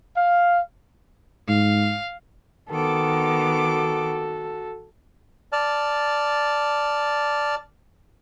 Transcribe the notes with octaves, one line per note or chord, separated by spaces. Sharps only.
F5
G#2 F5
D#3 B3 F#4 A4 D6
D5 A5 F6